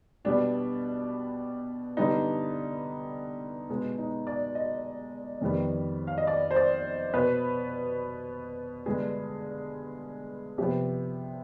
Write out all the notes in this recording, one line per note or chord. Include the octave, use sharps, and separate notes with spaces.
B2 G3 B3 D4
G2 D3 G3 B3 D#4
B2 G#3 B3
D#4
D5
D#5
F2 D#3 G3 B3
F5
D#5
D5
C5
D5
B2 B3 B4
G2 D3 G#3 B3 G#4
C3 F3 B3 G4